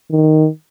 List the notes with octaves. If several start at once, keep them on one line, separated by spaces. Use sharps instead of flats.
D#3